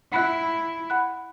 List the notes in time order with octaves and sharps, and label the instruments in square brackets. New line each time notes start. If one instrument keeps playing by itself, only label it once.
[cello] E4 [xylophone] F#5 B5 F#6
[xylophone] F#5 B5 F#6